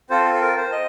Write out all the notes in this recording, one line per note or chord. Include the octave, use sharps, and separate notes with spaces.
C4 F4 A4 C5
A4
A#4
C5
D#5